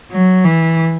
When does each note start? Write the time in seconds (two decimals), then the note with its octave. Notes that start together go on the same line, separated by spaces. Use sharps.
0.11 F#3
0.45 E3